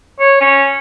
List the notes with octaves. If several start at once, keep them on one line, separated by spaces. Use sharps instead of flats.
C#5
C#4